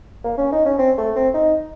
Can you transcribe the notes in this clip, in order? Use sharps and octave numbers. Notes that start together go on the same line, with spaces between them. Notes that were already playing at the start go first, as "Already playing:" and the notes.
A#3
C#4
D#4
C#4
C4
A3
C4
D#4